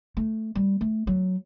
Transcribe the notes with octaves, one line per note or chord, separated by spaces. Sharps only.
A3
G3
A3
F#3